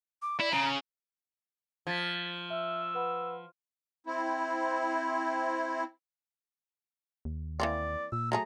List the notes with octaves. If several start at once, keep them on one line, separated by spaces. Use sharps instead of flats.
D6
E4 D5
C#3 A#5
F3 G#6 A6 B6
E5 E6
B4 F#5 B5
C4 E4
D#2
E3 A#3 C4 D5
A#2 E6
F#3 A3 G#4 A#5